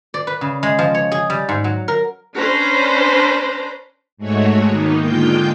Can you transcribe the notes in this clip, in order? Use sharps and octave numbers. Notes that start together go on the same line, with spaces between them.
D5
B4
C#3
G#3
F3
C#5
G#4
G3
G#2
F#3
A#4
C#4 D4 B4 C5 A#5
G#2 G#3 A3 F#4 C#5
D#3 A#3 B3 D#4
D3 G#3 A#3 F4 G5 G6